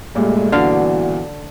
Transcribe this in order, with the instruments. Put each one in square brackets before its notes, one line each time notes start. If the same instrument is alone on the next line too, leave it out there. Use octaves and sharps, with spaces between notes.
[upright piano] G2 A#2 [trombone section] G#3 A3
[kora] D3 F5 [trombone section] E3 B3 F#4